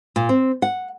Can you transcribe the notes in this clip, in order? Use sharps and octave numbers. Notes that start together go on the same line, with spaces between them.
A#2
C4
F#5